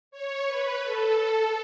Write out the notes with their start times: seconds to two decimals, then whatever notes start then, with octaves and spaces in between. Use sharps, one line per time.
0.11 C#5
0.47 B4
0.83 A4